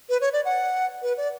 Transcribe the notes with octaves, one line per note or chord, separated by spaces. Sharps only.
B4
C#5
D5
F#5
B4
D5